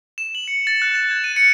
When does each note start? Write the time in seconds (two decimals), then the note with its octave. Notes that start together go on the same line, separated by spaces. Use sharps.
0.18 E7
0.35 F#7
0.48 C#7
0.67 A6
0.82 F#6
0.95 E7
1.11 G#6
1.24 D#7
1.36 C#7